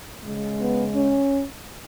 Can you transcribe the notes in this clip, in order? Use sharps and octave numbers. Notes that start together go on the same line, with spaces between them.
C#3 G#3
B3
C#4